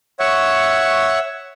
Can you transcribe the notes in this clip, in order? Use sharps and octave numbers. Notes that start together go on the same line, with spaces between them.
C#5 E5 F#5 C#6